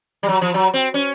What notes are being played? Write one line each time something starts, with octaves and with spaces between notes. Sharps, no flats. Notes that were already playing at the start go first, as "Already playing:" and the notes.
G3
F#3
F3
F#3
C4
C#4